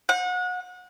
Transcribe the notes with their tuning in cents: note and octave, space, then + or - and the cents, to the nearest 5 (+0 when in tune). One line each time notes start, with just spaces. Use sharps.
F#5 -30